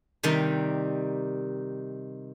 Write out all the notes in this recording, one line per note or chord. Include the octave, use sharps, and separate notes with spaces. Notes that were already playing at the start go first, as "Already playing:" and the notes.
C3 D#3 G3 D#4